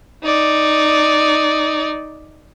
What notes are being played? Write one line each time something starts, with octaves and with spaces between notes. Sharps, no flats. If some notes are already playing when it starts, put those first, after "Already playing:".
D#4 D5